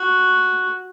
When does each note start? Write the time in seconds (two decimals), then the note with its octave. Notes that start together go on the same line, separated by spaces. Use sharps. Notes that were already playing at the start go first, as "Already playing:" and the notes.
Already playing: F#4